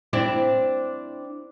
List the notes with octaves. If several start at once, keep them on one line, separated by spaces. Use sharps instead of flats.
C4 D4 E4